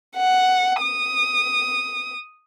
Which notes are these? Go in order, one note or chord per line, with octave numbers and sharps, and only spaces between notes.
F#5
D#6